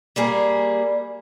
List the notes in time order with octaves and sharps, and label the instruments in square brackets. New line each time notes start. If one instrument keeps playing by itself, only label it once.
[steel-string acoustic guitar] G3 A#3 G#4